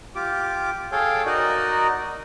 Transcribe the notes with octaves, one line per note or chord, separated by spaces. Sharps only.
F4 G4 D6
G#4 A4 C#5 F5 G5
D#4 F#4 A#4 D5 D#5